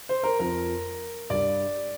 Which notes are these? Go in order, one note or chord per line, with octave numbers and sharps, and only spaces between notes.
C5
A#4
F2 F3 A#4
G2 G3 D5